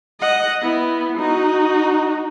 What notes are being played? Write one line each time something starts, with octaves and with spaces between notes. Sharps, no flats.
D#5 F#5
B3 E4
D#4 F#4